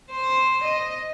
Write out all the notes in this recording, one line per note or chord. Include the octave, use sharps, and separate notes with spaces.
C5
D#5